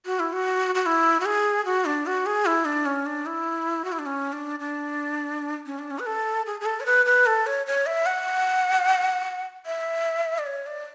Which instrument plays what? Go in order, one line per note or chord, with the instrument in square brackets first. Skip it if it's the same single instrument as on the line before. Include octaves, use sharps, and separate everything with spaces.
[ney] F#4
E4
F#4
F#4
E4
F#4
G#4
F#4
D4
F#4
G#4
E4
D4
C#4
D4
E4
F#4
E4
D4
C#4
D4
D4
C#4
D4
C#4
B4
A4
G#4
G#4
A4
C#5
B4
B4
A4
C#5
C#5
E5
F#5
E5
D5
C#5
D5